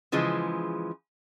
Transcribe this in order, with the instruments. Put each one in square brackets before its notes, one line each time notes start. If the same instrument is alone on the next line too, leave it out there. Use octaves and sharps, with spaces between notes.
[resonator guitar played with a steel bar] C#3 E3 F3 G#3